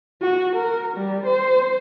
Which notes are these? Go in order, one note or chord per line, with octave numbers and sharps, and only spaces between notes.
F#4
A#4
G3
C5